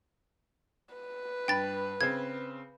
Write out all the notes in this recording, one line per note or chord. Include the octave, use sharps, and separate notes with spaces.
B4
G2 G5 B5 A6
C#3 C4 G#6